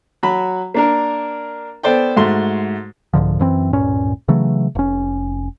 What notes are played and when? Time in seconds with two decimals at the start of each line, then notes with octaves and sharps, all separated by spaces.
0.23 F#3 F#4 B5
0.74 A#3 D4 A#4
1.83 B3 A4 C5 D5 G5
2.16 G#2 A3 F#4 C6
3.14 C2 G#2 D3 F3
3.39 F#2 E3 C4
3.73 D1 G2 A#2 C#4
4.28 C#3 E3 F#3 A3
4.75 F1 C#4